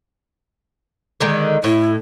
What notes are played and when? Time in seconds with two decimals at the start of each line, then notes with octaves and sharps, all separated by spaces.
1.20 D3 D#3 G#3
1.64 A2 E4